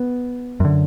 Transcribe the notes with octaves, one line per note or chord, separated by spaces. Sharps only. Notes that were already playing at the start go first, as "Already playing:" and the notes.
Already playing: B3
F#2 D3